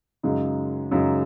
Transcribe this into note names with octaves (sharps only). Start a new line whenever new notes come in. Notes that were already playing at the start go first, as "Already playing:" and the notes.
F#2 C#3 G#3 D#4
F#2 C#3 G#3 D#4